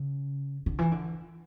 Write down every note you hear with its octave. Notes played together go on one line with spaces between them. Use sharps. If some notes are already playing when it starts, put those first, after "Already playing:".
Already playing: C#3
D3
E3
D3